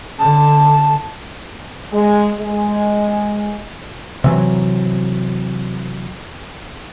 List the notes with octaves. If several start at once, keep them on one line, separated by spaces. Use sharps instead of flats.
D3 A5
G#3
G#3
C3 E3 F#3